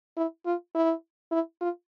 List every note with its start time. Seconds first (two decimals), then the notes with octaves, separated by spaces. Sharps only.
0.17 E4
0.46 F4
0.75 E4
1.32 E4
1.61 F4